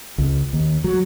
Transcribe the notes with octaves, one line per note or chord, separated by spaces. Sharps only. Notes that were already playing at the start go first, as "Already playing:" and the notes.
C#2
D#2
F#3